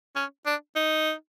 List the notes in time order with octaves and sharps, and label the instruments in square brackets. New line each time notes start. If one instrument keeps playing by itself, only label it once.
[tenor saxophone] C#4
D4
D#4